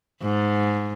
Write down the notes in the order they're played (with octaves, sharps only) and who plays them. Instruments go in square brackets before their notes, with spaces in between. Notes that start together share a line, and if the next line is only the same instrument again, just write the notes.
[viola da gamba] G#2